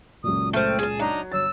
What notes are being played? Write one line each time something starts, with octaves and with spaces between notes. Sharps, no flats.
C#2 F#2 A#2 D#6
A3 C4 F6
G#4 A5
F#3 D4 D#4 A#5
G1 C#5 E6 A6